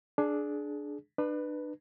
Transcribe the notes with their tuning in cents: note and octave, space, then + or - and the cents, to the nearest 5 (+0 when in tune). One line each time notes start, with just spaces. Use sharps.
D4 +0 G#4 +25
D4 +35 B4 +0